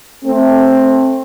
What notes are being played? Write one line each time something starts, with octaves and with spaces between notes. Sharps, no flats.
A3 C4